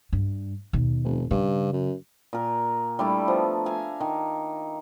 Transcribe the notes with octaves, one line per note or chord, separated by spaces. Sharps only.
G2
D#2 B2
F1
G2 C#3
F#2
A#2 A#4
G3 A3 D4 E4
F3 B3
E5 F5 G#5 A#5
D#3